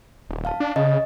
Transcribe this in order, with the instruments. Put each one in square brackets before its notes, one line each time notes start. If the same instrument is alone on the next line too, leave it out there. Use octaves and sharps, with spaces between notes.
[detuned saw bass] D#1
[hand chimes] F5 A5
[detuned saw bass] D4
[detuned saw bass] C#3 [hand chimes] D#5